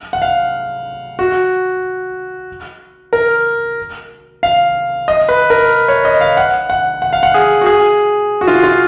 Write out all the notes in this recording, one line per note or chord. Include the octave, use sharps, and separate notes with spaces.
F#5
F5
F#4
A#4
F5
D#5
B4
A#4
C#5
D#5
F5
F#5
F#5
F#5
F5
F#5
G#4
F#4
G#4
F#4
F4
F4